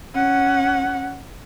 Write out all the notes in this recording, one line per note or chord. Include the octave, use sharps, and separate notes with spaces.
C#4 F#5